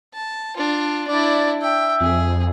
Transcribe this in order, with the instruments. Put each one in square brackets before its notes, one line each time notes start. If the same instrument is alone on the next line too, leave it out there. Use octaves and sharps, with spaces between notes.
[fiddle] A5
D4 F4
[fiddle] D4 E4 [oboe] D5
[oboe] E5 [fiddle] G5
[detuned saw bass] F2 [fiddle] G#4